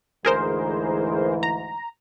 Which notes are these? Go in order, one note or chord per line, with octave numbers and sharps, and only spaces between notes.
D2 G#2 E3 G#4 A#4 C5
A#5